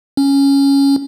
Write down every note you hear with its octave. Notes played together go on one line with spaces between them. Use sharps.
C#4